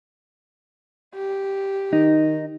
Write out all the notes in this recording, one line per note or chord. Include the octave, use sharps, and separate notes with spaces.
G4
D#3 D#4